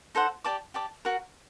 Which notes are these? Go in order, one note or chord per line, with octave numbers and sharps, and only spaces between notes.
D#4 A4 C5 F#5
G4 D5 A5 D6
G4 D5 A5 D6
F#4 A#4 F#5